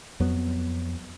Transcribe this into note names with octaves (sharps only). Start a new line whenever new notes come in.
F2 F#3 B3